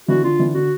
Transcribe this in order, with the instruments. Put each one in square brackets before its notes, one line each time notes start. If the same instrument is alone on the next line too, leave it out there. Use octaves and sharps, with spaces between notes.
[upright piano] D3 E3 [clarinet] F#4
[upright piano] D3 [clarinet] F4
[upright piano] D3 E3
[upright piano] D3 [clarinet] F#4